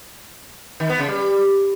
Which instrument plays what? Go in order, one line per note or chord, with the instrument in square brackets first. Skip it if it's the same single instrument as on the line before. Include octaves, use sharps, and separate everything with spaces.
[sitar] D#3
B3
C#3
G3